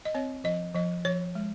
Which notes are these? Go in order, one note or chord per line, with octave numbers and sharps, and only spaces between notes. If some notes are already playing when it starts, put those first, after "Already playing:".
D#5
C4 C#5
F3 D#5
F3 D#5
F3 C#5
G#3